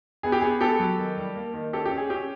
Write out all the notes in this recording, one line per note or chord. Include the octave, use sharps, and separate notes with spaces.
B3 G#4
G4
B3 G#4
B3 G4 A4
F#3
D#3
G3
A#3
D#3
C#4 G4 A4
G4
C#4
G#4
C#4 G4